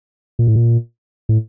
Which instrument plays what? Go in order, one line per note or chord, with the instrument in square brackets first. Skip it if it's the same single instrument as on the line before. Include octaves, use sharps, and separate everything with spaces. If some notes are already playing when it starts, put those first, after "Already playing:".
[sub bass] A#2
A2
A#2
A2